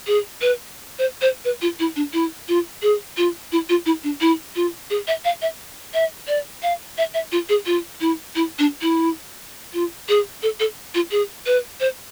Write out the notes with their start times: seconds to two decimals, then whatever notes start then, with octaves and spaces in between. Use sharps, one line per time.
0.07 G#4
0.41 B4
0.99 C5
1.22 C5
1.45 B4
1.62 F4
1.79 E4
1.96 D4
2.13 E4
2.48 F4
2.82 G#4
3.17 F4
3.52 E4
3.69 F4
3.86 E4
4.04 D4
4.21 E4
4.56 F4
4.90 G#4
5.07 E5
5.25 F5
5.42 E5
5.94 E5
6.28 D5
6.63 F5
6.98 E5
7.14 E5
7.32 F4
7.49 G#4
7.66 F4
8.01 E4
8.35 E4
8.59 D4
8.82 E4
9.74 F4
10.09 G#4
10.43 A4
10.60 A4
10.95 F4
11.11 G#4
11.46 B4
11.80 C5